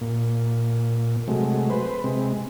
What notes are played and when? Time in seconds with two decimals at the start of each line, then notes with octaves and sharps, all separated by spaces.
0.01 A#2
1.28 C3 F#3 G#3 A3
1.70 B4 C5
2.04 C3 G#3 C4